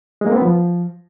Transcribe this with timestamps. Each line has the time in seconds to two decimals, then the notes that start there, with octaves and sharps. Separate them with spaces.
0.21 G#3
0.26 A#3
0.32 C4
0.37 B3
0.42 F3